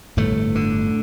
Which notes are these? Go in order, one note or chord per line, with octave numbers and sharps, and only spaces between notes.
G1 A2 A3
D3